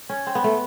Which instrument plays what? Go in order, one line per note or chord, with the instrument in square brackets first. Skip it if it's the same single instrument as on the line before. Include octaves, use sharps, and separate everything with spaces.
[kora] C#4
C4
B3
A3